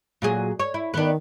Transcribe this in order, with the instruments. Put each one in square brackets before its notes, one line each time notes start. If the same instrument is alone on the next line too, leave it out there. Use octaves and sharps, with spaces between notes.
[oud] A#2 F#3 G#4
C#5
E4
[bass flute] D#3 [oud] B3 D4